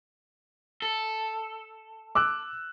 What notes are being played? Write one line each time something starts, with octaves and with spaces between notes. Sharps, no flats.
A4
D6 E6 F#6